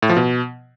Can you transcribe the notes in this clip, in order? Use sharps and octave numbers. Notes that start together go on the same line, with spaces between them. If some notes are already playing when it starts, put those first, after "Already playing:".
A2
F3
B2